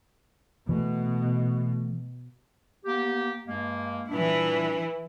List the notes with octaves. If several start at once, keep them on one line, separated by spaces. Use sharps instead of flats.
B2 E3 A3
A#3 B3 G4
G2 G#3 A#3
A#2 E3 G3 D4 E4